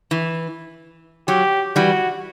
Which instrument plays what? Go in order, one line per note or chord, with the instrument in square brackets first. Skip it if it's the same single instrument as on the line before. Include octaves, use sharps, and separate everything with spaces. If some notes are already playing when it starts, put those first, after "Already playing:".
[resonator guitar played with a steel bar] E3
[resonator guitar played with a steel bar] F#3 [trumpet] G4
[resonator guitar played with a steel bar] E3 G3 [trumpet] F#4